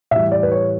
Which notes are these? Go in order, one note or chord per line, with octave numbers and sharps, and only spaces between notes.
A2 E3 G3 E5
D5
B4
C#5